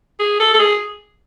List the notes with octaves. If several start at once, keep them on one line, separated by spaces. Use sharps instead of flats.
G#4
A4
A4
G#4